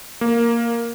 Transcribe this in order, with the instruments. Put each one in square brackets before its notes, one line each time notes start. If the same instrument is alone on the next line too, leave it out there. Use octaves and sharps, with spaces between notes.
[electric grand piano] A#3